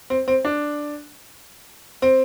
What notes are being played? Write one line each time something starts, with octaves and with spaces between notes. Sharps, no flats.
C4
C4
D4
C4